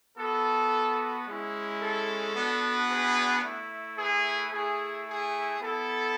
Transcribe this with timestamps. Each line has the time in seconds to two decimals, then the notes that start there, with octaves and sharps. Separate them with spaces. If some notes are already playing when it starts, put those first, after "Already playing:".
0.18 B3 F#4 A4
1.25 G#3 C#4 E4
1.81 A4
2.34 B3 D4 F#4
2.89 G#4 B4
3.44 A3 E4
3.97 G#4 B4
4.52 A3 E4 G#4
5.07 G#4
5.60 B3 E4 A4